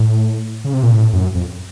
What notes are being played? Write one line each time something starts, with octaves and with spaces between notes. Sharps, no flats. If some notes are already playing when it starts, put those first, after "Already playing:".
Already playing: A2
C#3
C3
A#2
A2
F#2
F2